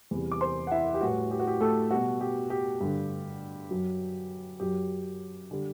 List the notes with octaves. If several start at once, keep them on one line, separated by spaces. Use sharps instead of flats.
E2 C3 G3
D6
C5 C6
F#5
E4 E5
G4
A2 E3 G3 F#4
G4
F#4
G4
A3 A4
B2 G3 F#4
G4
G4
G2 D3 G3
F#2 F#3
F#2 F#3 G4
D3 G3